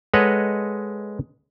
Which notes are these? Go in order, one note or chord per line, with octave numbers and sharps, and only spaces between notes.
G#3 A4 B4 C#5 D#5 F#5